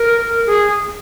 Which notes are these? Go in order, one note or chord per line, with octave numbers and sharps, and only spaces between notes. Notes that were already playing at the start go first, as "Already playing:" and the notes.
Already playing: A#4
G#4